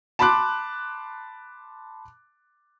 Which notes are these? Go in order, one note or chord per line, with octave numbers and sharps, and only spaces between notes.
A5 B5 C6 D6 F#6